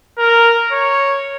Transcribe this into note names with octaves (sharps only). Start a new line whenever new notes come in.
A#4
C#5